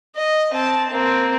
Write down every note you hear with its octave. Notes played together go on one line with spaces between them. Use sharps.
D#5
C4 A5
A#3 C4